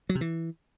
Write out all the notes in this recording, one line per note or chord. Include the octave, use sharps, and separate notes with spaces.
F#3
C3
E3